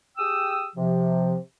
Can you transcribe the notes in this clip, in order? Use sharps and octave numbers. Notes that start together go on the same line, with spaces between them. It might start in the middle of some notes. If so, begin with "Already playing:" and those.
G4 G#4 G5 D#6 E6
C3 F3